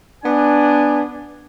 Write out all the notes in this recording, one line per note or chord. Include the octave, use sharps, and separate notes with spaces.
B3 D4 G#5